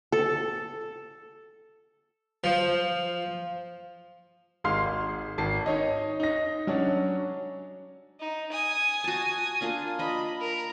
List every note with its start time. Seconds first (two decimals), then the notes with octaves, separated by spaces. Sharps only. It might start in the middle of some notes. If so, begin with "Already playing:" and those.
0.12 A4
2.44 F3
4.64 G#1 G#3 F5 C6 F6 C7
5.38 G#1 A5 C7
5.66 D#4 C#5 D#5
6.20 D#4 A#6
6.67 F#3 C#4 D4
8.20 D#4
8.51 G#5 D#6
9.04 F#4 A5
9.61 A#3 D4 F4
9.99 D4 D#5 B5
10.40 A#4